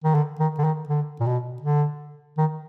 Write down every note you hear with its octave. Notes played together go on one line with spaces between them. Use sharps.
D#3
D3
D#3
D3
D#3
D3
A#2
B2
D3
D#3